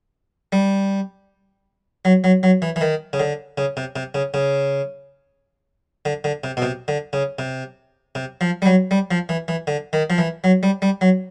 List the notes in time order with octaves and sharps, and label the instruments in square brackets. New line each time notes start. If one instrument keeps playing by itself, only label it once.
[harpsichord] G3
F#3
F#3
F#3
E3
E3
D#3
C#3
D3
C#3
C3
C3
C#3
C#3
D3
D3
C3
B2
C3
D3
C#3
C3
C3
F3
G3
F#3
G3
F3
E3
E3
D3
D#3
F3
E3
F#3
G3
G3
F#3